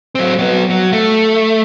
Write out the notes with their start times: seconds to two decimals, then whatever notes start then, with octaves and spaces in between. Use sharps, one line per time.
0.15 F#3 C4
0.39 F#3 B3
0.70 F#3
0.93 A3